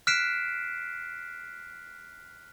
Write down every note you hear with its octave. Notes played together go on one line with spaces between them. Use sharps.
F6 F#6 B6 C7 D7 E7